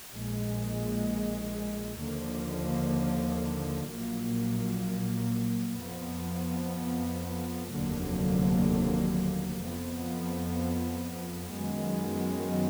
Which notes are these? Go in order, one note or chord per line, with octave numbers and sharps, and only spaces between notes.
A#1 A#2 G#3
D#2 D3 F3 A#3
A#1 A#2 F#3 A#3
F2 F3 B3
F1 D#2 D3 F#3 A#3
F2 F3 B3
F#2 D#3 G#3 B3